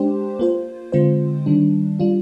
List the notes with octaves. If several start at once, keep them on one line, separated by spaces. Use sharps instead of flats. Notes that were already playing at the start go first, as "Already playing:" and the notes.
Already playing: G#3 D4 G4 C5
A#3 F4 C5
D3 G#3 C4 F4 C5
D#3 G3 D4
G3 D4 F4